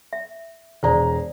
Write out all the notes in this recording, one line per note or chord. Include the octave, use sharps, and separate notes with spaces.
E5
E1 G#4 C5 D5 A#5